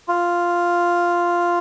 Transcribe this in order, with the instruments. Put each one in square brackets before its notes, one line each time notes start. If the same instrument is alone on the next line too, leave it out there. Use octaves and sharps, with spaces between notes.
[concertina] F4